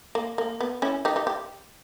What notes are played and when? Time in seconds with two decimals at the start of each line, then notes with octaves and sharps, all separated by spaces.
0.15 A#3
0.38 A#3
0.60 B3
0.82 C#4 E4
1.05 D#4 G4
1.16 D#4 G4
1.27 G4